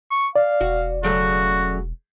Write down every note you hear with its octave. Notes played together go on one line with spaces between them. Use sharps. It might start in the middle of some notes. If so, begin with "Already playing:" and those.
C#6
D5 F5
E1 F#4
C#3 F#3 A3 F#4